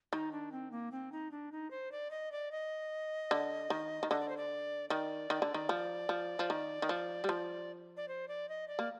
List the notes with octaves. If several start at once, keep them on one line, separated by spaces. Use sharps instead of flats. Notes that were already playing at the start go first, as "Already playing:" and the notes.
D#3 D#4
D4
C4
A#3
C4
D#4
D4
D#4
C5
D5
D#5
D5
D#5
D3
D#3
D#3
D3 D#5
D5
C5
D5
D#3 D5
D#3
D3
D#3
F3
F3
F3
D#3
D#3
F3
G3
F3
D5
C5
D5
D#5
D5
A#3